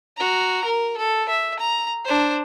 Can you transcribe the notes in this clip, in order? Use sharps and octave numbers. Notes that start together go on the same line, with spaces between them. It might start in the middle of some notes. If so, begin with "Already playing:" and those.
F#4 A#5
A#4
A4
E5
A#5
D4 C5